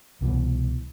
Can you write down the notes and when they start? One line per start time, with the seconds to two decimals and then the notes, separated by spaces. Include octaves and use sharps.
0.21 C2 B2 E3